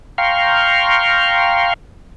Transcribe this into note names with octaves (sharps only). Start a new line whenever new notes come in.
F5 G5 A#5 C6 C#6 F6